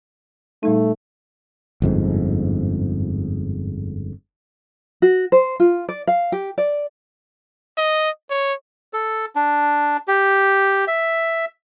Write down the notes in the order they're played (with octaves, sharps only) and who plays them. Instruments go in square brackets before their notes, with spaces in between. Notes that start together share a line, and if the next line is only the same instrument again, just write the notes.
[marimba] A#2 G3 D#4 [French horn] A3
[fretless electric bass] G1 F2 G#2
[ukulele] F#4
C5
F4
D5
F5
G4
D5
[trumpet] D#5
C#5
[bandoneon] A4
D4
G4
E5